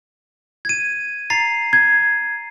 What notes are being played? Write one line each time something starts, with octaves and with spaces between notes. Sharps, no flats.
G#6 D#7
A#5 A6 C7
G#6